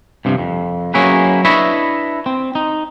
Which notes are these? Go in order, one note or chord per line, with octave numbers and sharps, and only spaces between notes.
G2 C3 F3
F2
F#3 A#3 C#4 E4 G#4 B4
D4 E4 B4 C#5 D#5 E5
C4
D#4